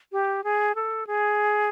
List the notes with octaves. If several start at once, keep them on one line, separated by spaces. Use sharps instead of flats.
G4
G#4
A4
G#4